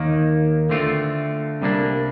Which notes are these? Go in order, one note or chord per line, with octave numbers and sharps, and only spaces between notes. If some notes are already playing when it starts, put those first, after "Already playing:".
Already playing: D#2 D#3 A#3 D#4
D3 A3 C4 F4
C2 C3 G3 A#3 D4